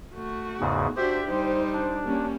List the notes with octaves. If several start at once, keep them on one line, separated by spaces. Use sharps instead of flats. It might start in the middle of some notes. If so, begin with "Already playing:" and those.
A3 F#4
E2 G#2 C#3
D4 F#4 G4 C5 E5
G3 D#4 C5
D4
G3 A#3 C#4